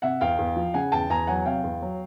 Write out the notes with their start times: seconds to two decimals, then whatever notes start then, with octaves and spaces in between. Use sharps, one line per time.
0.02 C3 E5 F#5
0.21 E2 F5 G5
0.38 E2
0.56 F3
0.74 C#3 F#5 G#5
0.92 E2 G5 A5
1.10 E2 G#5 A#5
1.27 F#3 F#5 G#5
1.45 C3 F5 G5
1.64 E2
1.82 F#3